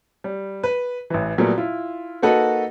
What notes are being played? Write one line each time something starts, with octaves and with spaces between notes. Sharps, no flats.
G3
B4
A1 E3
A#2 F#3 G3 A3 B3
E4 F4
A#3 D#4 F#4 A4 B4